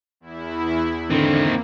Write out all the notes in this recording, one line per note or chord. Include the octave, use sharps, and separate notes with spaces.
E2 E4
D3 D#3 A#3 C4